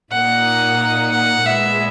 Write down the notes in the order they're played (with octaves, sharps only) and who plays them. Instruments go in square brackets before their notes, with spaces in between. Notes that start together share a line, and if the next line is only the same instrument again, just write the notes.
[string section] A#2 A#3 D#4 [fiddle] F#5
[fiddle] F#5
[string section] A#2 G#3 B3 [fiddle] E5